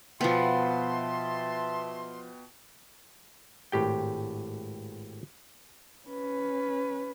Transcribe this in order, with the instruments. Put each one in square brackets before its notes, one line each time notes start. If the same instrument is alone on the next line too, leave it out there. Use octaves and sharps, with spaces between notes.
[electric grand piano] B2 B4 G5 [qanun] F3 B3 [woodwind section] E5 A5 C6
[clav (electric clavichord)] G#1 A2 G4 G5
[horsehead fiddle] C#4 B4